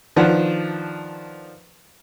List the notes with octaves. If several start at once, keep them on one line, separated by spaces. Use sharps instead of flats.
D#3 F3 D4 B4 F#5